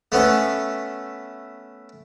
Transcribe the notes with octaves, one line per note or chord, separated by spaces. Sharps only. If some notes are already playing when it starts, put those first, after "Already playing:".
A3 B3 C#4